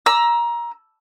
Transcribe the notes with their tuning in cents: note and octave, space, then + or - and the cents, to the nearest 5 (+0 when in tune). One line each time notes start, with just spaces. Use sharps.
A#5 +20 E6 +5